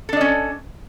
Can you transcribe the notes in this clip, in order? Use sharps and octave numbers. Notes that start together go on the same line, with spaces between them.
C#4 D4 A4 D#5